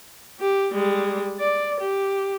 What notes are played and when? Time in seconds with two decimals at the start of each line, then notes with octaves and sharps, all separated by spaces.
0.40 G4
0.72 G3 G#3
1.40 D5
1.81 G4